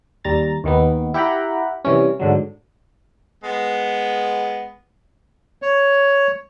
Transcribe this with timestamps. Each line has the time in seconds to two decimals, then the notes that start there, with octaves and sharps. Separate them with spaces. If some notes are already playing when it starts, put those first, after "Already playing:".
0.24 D#2 G3 A#5 A6
0.64 D#2 D#3 B3
1.14 E4 G4 F#5 G5 A#5 B5
1.85 C3 E3 G3 C#4
2.19 G#2 D3 F#3
3.44 G#3 B3
5.62 C#5